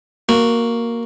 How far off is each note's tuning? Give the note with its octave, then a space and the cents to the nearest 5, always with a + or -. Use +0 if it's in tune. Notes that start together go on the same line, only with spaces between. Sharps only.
A#3 +0 F#4 +0